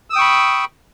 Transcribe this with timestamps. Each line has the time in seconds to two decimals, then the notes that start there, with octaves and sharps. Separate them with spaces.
0.10 E6
0.13 D#6
0.16 G5
0.18 C#6
0.21 B5